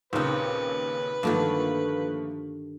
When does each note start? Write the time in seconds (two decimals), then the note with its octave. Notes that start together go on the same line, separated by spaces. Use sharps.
0.13 D#2 A#2 C#3 C4 D#4 B4
1.23 G2 D3 D#3 F3 A3 A#3